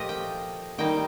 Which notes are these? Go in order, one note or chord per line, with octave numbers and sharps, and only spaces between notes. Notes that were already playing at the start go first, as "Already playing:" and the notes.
Already playing: A#2 F3 A3 F4 G4 D#5
G5
D#3 G3 A#3 D#4 G5